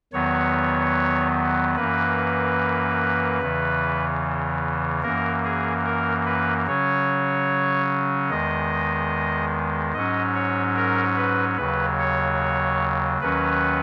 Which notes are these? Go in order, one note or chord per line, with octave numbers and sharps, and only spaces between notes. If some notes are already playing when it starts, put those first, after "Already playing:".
E2 D#3 F#3 B3 C#5
F#2 E3 A#3 B4
E2 C#3 E3
F#2 E3 A#3 A#4
G#4
A#4
B4
C#3 F#3 C#4 C#5
E2 D#3 G#3 D#5
G#2 F#3 C#4 D#5
C#5
A#4
B4
D#2 C#3 F#3 B4
C#5
D#2 D#3 F#3 C#4 B4